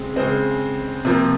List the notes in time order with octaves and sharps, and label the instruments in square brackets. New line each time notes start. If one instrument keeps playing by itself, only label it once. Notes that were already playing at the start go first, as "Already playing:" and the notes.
Already playing: [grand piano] C#3 G#3 C4
C#3 G#3 C4 C5
C3 F3 A#3